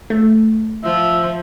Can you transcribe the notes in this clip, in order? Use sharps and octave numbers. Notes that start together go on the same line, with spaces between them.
A3
F3 E5